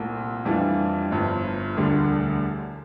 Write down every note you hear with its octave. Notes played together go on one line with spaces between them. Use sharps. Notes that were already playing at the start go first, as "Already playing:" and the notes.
Already playing: C2 A#2 A3
F2 E3 G3 D4 F4
G1 G2 F3
E1 D2 D3 G3 D4